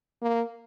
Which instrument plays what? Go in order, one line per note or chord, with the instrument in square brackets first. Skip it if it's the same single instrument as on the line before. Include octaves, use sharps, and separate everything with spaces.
[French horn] A#3